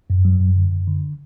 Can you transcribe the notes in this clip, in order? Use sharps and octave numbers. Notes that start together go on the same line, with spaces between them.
F#2
F#3
F#2
D3
F#2
D3